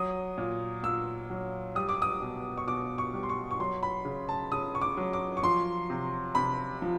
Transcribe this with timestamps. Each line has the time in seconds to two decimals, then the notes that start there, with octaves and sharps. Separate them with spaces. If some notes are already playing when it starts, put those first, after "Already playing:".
Already playing: F#3 D#6
0.38 A#2
0.83 A#2 E6
1.30 F#3
1.75 G3 D#6
1.89 D6
2.02 D#6
2.22 B2
2.57 C#6
2.67 B2 D6
2.98 C#6
3.14 G3
3.23 C6
3.29 C#6
3.51 C#6
3.60 F#3 C6
3.83 B5
4.05 C#3
4.29 A5
4.52 C#3 D#6
4.75 C#6
4.82 D6
4.97 F#3
5.13 D6
5.37 C#6
5.43 F3 C6
5.90 C3
6.35 C3 B5
6.82 F3